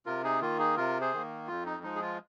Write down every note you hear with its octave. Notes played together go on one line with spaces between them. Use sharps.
C3 F4 A#4
D#4 G#4
D#3 A#3 F4
D#4 G#4
C3 F4 A#4
G#4 C5
D#3 A#3
F2 F4
D#4
F3 G#3 D#4
G#4
F4